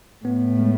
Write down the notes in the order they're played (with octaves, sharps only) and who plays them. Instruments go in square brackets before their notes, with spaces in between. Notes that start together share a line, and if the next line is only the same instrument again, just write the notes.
[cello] A2 [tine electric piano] B3
[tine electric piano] G#3